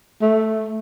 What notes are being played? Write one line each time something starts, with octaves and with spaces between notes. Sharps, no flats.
A3